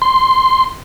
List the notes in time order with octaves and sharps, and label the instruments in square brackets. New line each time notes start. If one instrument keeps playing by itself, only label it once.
[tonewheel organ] C6